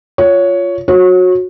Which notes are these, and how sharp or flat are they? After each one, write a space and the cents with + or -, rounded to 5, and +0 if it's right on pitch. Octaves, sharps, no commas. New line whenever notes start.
F4 +0 C#5 +10
F#4 -20 C#5 -30